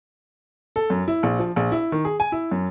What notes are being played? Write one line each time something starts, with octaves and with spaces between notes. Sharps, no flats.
A4
F#2
E4
A#1
F3
A#1
E4
D#3
G#4
G#5
E4
F#2